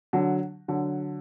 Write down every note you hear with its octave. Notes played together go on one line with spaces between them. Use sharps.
D3 F#3
D3 F#3